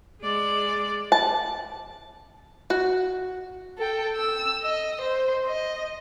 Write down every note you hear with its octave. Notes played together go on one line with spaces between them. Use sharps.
G#3 D5
A5
F#4
A4 G5
E6
D#5
C5
D#5